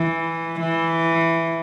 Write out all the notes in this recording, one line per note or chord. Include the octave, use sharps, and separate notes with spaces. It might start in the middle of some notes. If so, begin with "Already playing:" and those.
Already playing: E3
E3